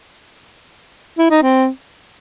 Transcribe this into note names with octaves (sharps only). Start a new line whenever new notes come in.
E4
D#4
C4